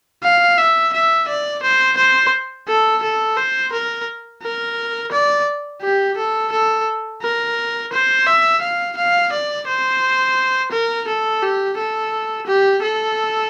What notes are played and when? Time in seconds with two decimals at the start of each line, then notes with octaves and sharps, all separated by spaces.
0.23 F5
0.58 E5
0.93 E5
1.28 D5
1.63 C5
1.97 C5
2.68 A4
3.02 A4
3.37 C5
3.72 A#4
4.42 A#4
5.12 D5
5.82 G4
6.17 A4
6.52 A4
7.22 A#4
7.93 C5
8.27 E5
8.61 F5
8.97 F5
9.32 D5
9.67 C5
10.71 A#4
11.07 A4
11.42 G4
11.77 A4
12.47 G4
12.82 A4